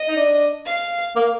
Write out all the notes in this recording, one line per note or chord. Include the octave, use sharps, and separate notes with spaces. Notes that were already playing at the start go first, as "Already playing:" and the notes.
Already playing: D#5
D#4
D4
F5
A#3